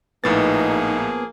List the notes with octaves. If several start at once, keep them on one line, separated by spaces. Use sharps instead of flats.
A#1 A2 F3 A#3 B3 D#4 G#4 A6